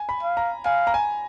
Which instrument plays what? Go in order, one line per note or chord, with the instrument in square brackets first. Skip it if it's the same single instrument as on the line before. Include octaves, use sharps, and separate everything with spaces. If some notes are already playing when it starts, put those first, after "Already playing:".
Already playing: [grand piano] G#5
B5
[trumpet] F5
[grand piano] A#5
[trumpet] F5 [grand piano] G#5
[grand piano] A#5
G#5